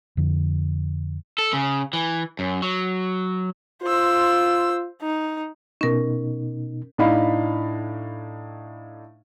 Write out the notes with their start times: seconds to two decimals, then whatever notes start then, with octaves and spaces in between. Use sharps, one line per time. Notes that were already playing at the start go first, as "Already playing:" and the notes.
0.17 F2 D3
1.38 A4
1.53 C#3
1.93 E3
2.39 F#2
2.62 F#3
3.83 F4 C5 E6
5.02 D#4
5.81 B2 C#4 D#4 A#4
6.98 A2 D4 D#4 F5 B5